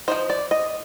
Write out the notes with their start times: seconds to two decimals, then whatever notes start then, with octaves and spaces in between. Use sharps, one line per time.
0.08 F3 G#3 D#4 C5
0.30 D5
0.51 D#5